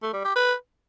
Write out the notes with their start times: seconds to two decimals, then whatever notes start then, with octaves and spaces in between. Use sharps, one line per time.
0.02 A3
0.14 G3
0.25 G4
0.36 B4